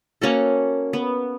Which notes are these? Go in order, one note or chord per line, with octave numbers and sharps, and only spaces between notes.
A#3 C#4 F#4 A4
B3